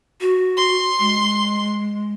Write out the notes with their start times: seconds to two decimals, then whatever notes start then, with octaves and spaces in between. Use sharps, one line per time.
0.21 F#4
0.57 C6
0.99 G#3